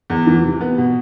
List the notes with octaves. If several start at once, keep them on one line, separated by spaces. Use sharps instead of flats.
E2
E3
C3
B3
B2